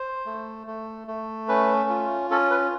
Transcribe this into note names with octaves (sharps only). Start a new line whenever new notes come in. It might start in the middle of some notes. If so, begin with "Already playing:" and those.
Already playing: C5
A3
A3
A3
C#4 B4
F4
C#4 A4
B4